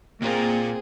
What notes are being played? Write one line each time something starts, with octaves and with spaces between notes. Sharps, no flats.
A#2 A#3 C4 F4 G#4